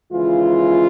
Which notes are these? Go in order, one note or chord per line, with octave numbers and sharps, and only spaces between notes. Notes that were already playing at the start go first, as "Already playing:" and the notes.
D#2 C#3 E3 G#3 F4